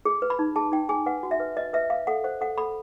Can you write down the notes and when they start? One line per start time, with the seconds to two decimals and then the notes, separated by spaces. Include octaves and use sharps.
0.05 G#4
0.22 B4
0.30 B5
0.39 D#4
0.56 G#4 A5
0.72 D#4 G5
0.89 G#4 G#5
1.06 B4 F#5
1.23 F#4
1.31 E5
1.40 B4
1.57 B4 D#5
1.73 B4 E5
1.90 B4 F5
2.07 A4 F#5
2.24 C5 F#5
2.41 A4 F#5
2.58 A4 B5